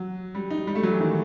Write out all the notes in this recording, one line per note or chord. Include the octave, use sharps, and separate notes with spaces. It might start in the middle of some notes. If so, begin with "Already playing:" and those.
Already playing: F#3
G3
D#4
G3
A3
F#3
E3
D#3